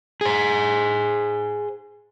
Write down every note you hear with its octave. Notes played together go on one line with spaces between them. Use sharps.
G#4 C5